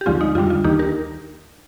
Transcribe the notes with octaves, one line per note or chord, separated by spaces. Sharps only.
G4
D#2 D3 F3 G#3 C4 F4
D#4
F2 D3 G3 D4 F4
F4
D#2 D#3 A#3 D4 D#4 G4
G4 A#4